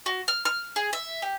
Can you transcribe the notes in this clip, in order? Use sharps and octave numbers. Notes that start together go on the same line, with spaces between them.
F#4
F6
F6
G#4
E5
G4